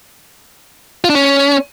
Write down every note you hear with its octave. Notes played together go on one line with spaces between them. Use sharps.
F4
D4
C#4